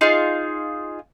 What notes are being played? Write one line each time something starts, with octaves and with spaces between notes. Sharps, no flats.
D#4 F4 G#4